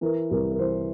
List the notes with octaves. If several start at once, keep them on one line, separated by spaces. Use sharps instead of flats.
E3 A#4
C2 A#4
A#4
E3 C5